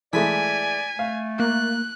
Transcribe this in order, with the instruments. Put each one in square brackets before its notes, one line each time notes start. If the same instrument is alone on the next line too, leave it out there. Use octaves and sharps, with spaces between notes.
[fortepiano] E3 G#3 A3 [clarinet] D5 [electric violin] G#5 [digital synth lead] B6
[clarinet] A3 [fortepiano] F5
[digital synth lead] A#3 [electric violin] F#6